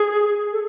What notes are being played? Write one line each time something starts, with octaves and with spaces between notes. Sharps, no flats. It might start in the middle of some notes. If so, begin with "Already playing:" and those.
Already playing: G#4
A4